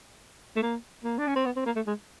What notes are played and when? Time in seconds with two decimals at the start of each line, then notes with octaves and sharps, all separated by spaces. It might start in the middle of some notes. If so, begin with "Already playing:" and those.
0.56 A3
0.63 A#3
1.04 A#3
1.18 D4
1.27 C#4
1.36 C4
1.45 B3
1.56 C4
1.66 A#3
1.76 A3
1.87 G#3